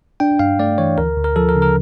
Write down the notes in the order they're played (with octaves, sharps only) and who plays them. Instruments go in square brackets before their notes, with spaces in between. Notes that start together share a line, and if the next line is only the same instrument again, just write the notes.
[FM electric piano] D4 [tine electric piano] G5
[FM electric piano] G2 [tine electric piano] F5
[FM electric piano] A3 [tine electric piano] D5
[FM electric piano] E3 [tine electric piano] C#5
[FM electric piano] D2 [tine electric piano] A#4
[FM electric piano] D2
[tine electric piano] A#4
[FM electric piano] F3 [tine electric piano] A4
[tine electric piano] A#4
[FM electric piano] C#3
[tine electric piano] A#4